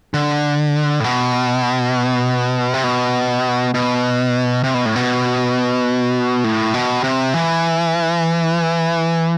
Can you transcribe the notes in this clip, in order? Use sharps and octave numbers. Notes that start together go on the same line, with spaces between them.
D3
A2
B2
C3
B2
B2
C3
B2
A2
B2
A2
B2
C3
E3